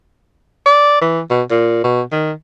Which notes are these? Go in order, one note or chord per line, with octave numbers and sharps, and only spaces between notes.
D5
E3
B2
A#2
B2
D#3